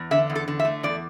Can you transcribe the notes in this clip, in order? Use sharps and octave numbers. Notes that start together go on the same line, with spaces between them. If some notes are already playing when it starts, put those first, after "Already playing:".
Already playing: E2
D3 E5
E2
A4
D3
E5
A3
E2 D5